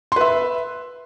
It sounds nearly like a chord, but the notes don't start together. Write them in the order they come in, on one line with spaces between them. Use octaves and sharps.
C6 B4 E5